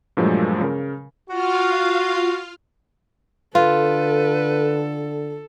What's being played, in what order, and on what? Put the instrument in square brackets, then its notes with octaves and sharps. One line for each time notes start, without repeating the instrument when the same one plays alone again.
[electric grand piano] G2 A#2 F3 F#3 G#3 A3
C#3 A#4
[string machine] F4 F5 [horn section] F#4
[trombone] D3 [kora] F4 [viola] A4 [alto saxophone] B4